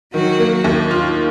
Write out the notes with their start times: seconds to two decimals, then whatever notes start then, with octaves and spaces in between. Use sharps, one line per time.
0.14 D#3 F#3 F#4
0.39 A#3
0.64 D#2
0.91 F4